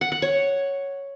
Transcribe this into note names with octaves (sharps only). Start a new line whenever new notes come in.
F#5
F#5
C#5